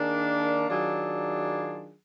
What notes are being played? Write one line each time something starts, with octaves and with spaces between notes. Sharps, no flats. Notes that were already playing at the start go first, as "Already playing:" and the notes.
Already playing: D#3 A#3 D4 G#4
D#3 F#3 D4 F4 G#4